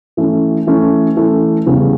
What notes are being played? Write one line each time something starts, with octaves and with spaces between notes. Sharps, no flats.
E3 A3 C#4
E3 A3 C#4
E3 A3 C#4
E2 C#3 G3 C#4